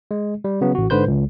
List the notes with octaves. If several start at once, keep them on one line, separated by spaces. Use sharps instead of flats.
G#3
G3
C#3 F#3 B3
A1 F#4
G#2 D3 B4 C5 G6
C#2